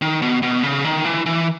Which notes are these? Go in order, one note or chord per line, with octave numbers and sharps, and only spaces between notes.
D#3
B2
B2
C#3
D#3
E3
E3